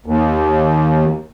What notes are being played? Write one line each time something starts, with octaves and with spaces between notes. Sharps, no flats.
D#2